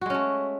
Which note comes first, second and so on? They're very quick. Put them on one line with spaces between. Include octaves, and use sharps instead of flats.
F#4 G#3 C#4 A3